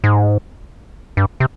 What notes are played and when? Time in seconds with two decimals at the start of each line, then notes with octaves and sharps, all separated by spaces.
0.04 G#2
1.17 G2
1.40 C3